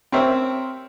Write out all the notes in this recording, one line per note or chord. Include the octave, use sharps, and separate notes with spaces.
C4 G4 A#4 C5 C#5 E5